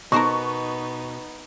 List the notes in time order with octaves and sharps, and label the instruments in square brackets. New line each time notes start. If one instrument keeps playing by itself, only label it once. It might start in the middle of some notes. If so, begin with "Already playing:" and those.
[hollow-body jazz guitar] B2 A5 [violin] B3 D#4 [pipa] A#4 C5 D#5 [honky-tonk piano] C#6